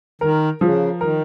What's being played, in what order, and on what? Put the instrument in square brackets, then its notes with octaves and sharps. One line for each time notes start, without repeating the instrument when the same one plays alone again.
[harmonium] D#3 [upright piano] A#4
[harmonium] C#3 [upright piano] F3
[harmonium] D#3 [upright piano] A#4